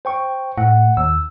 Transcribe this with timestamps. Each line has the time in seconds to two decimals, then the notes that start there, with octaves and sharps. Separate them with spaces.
0.05 C5 G5 C#6
0.58 A2 F#5
0.97 D#2 E6